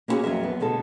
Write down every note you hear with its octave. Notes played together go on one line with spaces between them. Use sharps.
A#3 B3 C#4 F4 F#4 G#4
F2 F#3 A#4 E5
B3
B2 D3 G#3 A4